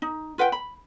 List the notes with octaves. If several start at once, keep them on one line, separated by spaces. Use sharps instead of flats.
D#4
F4 B4 F#5 G5
B5